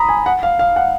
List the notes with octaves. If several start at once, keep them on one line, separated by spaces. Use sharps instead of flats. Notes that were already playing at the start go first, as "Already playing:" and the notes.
Already playing: A#5 B5 D#6
G#5
F#5
F5
F5
F#5